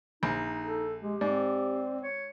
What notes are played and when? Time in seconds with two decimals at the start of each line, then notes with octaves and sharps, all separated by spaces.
0.23 A#1 D#4
0.63 A4
1.02 G#3 G4
1.21 G#2 C4 D5
2.03 C#5